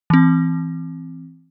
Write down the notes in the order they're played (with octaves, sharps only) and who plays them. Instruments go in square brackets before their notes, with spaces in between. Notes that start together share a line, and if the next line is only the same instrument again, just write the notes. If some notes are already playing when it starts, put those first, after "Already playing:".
[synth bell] E3 C4